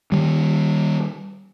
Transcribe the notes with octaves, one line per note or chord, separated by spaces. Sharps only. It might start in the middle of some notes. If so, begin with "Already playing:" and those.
D#3 G3